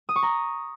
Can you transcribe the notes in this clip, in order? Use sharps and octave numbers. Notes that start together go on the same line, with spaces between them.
D#6
C#6
A#5